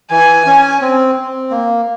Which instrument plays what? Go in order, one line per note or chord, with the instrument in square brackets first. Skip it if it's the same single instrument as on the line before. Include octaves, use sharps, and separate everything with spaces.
[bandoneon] E3 [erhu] G#5
[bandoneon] C#4
C4
C4
A#3